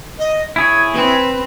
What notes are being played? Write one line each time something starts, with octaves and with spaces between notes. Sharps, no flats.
D#5
E4 G#4 C#5 G#6
C4 B4